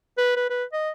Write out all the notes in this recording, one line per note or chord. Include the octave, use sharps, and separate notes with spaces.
B4
B4
B4
D#5